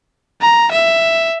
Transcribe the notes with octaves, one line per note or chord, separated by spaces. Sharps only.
A#5
E5